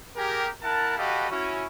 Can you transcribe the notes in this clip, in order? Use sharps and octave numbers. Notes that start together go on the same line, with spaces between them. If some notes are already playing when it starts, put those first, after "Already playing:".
G4 G#4 A#4
E4 A#4 F#5 A5
F#4 G4 A4 B4 D#5 F5
C#4 E4 F#4